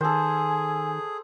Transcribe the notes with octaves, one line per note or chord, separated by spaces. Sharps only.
D#3 G#4 A4 C5 G#5